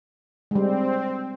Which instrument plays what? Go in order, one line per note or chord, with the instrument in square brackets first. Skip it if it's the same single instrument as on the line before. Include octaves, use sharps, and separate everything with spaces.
[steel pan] G3 G#3 [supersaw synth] C4